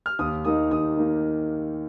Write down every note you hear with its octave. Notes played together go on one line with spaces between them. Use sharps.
F6
D#2 D#6
D#3 A#3 D#4 D#6
D#2 D#6
D#3 A#3 D#4